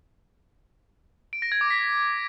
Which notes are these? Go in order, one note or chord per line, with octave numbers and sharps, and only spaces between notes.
D7
A#6
G#6
D6
B6